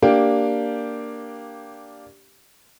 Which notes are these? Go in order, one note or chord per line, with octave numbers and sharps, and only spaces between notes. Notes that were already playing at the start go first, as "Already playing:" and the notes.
A#3 D4 G4